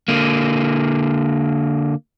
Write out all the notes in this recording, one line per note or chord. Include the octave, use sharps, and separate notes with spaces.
D3 A#3